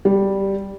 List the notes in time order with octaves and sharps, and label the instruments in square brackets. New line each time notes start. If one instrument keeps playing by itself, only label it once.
[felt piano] G3